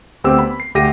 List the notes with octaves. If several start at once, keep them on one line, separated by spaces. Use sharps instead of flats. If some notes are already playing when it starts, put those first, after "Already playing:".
D2 B3 C4 G4 E6
B5
C7
D2 G4 A#6 D#7